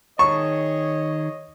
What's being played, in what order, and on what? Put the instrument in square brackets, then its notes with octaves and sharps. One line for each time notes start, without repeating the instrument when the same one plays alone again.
[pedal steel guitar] D#3 G#4 A5 [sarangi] C#5 [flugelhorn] D#5 [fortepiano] C#6